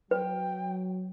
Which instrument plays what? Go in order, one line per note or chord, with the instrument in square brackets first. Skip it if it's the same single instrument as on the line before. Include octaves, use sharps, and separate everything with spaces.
[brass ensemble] F#3 [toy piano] B4 [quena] G5